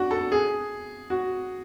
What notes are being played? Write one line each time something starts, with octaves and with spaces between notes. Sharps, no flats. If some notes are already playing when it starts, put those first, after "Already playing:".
Already playing: D4 F#4
A4
G#4
F#4